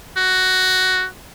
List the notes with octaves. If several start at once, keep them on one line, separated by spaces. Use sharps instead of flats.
F#4